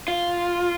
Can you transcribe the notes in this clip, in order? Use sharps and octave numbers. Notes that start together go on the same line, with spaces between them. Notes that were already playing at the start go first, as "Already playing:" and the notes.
F4